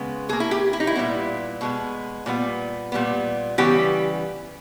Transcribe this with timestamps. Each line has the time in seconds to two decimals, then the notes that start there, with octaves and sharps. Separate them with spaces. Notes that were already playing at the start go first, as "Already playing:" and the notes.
Already playing: C#3 G#3 B3
0.29 B2 G#4
0.33 A#3
0.40 E4
0.51 G4
0.73 E4
0.80 D#4
0.87 E4
0.96 A#2 G3 B3
1.61 B2 G#3 B3
2.26 A#2 G3 B3
2.92 A#2 G3 B3
3.58 C#3 E3 G3 B3 G4